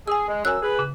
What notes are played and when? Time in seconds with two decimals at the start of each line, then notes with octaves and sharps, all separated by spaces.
0.08 G#4 G#5 E6
0.28 G#3
0.45 F#2 G#5 E6 F#6
0.63 G#4 B4
0.79 C#3